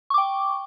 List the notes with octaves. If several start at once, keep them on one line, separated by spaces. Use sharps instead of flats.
G5 C#6 D6